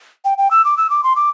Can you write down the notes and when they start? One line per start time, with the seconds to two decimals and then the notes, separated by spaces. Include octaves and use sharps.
0.25 G5
0.38 G5
0.51 E6
0.65 D6
0.77 E6
0.90 D6
1.04 C6
1.16 D6